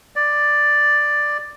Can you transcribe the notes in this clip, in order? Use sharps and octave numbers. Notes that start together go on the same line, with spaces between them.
D5